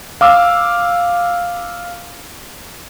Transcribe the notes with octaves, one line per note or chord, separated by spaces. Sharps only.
F5 D6 E6